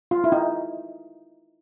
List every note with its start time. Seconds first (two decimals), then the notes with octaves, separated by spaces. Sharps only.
0.11 F4
0.24 E4
0.32 D#4